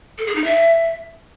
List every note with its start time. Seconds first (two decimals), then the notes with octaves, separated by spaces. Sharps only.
0.18 A4
0.27 G#4
0.35 D#4
0.44 E5